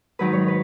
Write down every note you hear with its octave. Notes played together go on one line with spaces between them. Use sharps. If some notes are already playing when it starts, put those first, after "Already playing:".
G#2 D#3 F#3 B4
C#5
B4